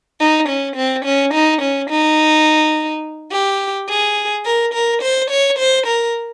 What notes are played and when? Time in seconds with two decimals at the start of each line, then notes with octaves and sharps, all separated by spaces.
0.20 D#4
0.49 C#4
0.76 C4
1.05 C#4
1.34 D#4
1.62 C#4
1.90 D#4
3.32 G4
3.89 G#4
4.46 A#4
4.74 A#4
5.02 C5
5.31 C#5
5.59 C5
5.87 A#4